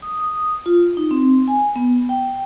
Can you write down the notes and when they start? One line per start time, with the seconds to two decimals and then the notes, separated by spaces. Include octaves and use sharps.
0.02 D#6
0.20 D#6
0.66 F4
0.97 D#4
1.11 C4
1.48 G#5
1.76 B3
2.09 G5